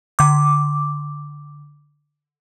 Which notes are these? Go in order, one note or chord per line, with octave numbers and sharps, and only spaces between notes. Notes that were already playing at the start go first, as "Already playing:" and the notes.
D3 D6